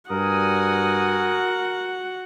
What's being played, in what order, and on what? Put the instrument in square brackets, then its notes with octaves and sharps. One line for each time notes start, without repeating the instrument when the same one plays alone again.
[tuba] G2 [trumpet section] G3 G#5 D#6 [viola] F#4 F#5 [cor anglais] A#4